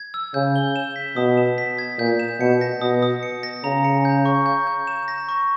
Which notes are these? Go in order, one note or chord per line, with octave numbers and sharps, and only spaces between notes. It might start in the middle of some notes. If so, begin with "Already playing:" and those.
Already playing: G#6
E6
C#3 G6
G7
E7
B6
B2 D#6
E7
B6
G#6
A#2 G6
E7
B2 C#7
A#6
B2 D#6
D#6
C#7
A#6
C#3 A#5
C#7
G6
C#6
G6
G6
E7
A#6
C#6